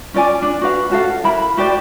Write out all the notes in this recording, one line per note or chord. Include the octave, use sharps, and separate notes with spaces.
C#4 F4 D5 G#5
D4
F#4 B4 F5
C#4 F#4 A4 F5
E4 A#4 B5
F#4 G4 C5 D5